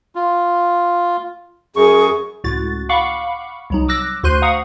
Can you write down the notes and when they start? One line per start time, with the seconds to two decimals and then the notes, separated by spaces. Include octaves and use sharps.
0.15 F4
1.76 F#2 G#4 C#6
2.44 C#2 A2 F#4 A6
2.89 F5 F#5 B5 C#6 D6
3.70 C2 F#3 D#4
3.88 D6 E6 F#6 A#6
4.23 D2 F#4 C5 C6 F#6 D#7
4.42 F5 F#5 A#5 C#6 D#6